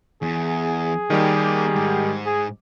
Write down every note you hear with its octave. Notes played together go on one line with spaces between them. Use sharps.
E2 G#4
D#3 G3 A#3 G4 D#5
G#2
G#4